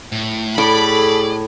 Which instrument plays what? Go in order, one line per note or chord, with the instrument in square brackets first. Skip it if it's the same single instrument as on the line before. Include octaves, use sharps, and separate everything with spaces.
[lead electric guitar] A2
[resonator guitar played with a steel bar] A2 [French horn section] G#4 A4 [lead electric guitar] D5 [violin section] B5